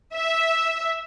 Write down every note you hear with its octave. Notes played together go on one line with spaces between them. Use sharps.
E5